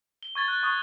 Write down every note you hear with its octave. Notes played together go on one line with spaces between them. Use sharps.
G7
C#6 G#6 A6 G7
F#6
C#6 D#6